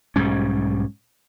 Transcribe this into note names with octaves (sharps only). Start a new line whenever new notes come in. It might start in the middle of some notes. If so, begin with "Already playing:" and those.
B1 G#2 G3 C#4